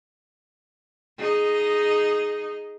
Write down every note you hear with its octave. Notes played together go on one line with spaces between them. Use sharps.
D#4 G#4 D#5